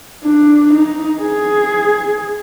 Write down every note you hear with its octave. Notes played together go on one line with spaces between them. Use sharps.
D4
D#4
G#4